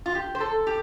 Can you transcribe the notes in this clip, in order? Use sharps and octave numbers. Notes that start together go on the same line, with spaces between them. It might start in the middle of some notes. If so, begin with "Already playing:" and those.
F4
G4
C5
A4
G4